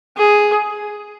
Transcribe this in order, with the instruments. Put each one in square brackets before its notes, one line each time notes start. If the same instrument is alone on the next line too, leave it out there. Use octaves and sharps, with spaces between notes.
[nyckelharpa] G#4